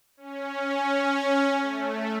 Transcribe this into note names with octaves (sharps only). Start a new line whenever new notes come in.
C#4
A3